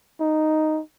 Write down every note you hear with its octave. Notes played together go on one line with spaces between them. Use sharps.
D#4